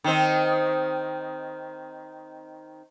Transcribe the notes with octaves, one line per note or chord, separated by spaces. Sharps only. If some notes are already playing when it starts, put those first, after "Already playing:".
D#3 C4